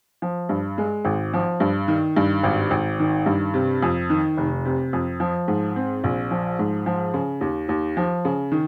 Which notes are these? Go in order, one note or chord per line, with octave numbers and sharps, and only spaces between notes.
F3
G2
G#3
G#1
F3
G2
D#3
G2
G#1
G#1
D#3
G2
C3
F2
D#3
F1
C3
F2
F3
G#2
C4
A#1
F3
G#2
F3
C#3
D#2
D#2
F3
C#3
D#3